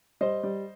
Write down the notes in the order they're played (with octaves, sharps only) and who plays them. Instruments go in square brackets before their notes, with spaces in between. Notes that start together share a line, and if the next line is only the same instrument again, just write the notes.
[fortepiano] G3 C5 D#5
G3